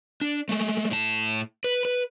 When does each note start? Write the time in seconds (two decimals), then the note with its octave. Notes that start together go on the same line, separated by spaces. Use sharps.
0.21 D4
0.49 G#3 A3
0.90 A2 A5
1.64 B4
1.85 B4